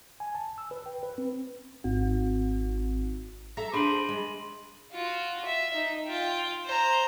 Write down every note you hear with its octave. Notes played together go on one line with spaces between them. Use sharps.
G#5
A5
E6
B4
G5
B4
C4
G#1
A4 E5 A#5 A#6
D4 G#4 C5 B5 C6 D#7 F#7
G#3
F4 F#4
E5
D#4
F4 G5
C5 A#5